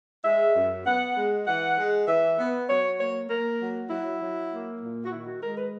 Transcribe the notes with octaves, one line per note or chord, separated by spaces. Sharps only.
G#3 E5
F#2
B3 F#5
G#3
E3 F#5
G#3
E3 E5
B3
F#3 C#5
A#3 C#5
A#3 A#4
F#3
F#3 E4
F#3
A#3
A#2
F#4
D#3 E4
F#4
G#3 A#4
B4